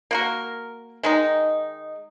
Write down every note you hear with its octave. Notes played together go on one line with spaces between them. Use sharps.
A#3 F#4 A#4
D#3 G#3 D#4